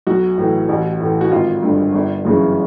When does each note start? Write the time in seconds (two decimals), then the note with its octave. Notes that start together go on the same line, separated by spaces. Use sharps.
0.07 B1 F#4
0.38 A2 E3
0.69 A1
1.01 A2 E3
1.21 F#4
1.32 G#1 F4
1.63 G2 D3
1.94 G1
2.25 F#2 C#3 E3